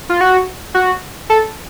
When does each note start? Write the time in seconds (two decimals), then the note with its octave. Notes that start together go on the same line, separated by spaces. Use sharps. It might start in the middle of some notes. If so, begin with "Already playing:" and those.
0.09 F4
0.21 F#4
0.74 F#4
1.30 A4